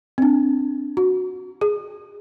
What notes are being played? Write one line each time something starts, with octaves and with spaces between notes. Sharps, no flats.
C4 D4
F#4
G#4